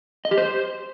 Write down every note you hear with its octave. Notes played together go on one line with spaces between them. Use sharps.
D#5
G4
C5